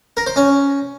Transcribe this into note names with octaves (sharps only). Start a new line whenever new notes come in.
A#4
C5
C#4